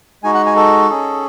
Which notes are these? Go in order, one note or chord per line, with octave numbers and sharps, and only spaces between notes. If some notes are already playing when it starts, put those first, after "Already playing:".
G#3 D#4 F#4 G#5
F#5
G#5
A4
C#4 G#4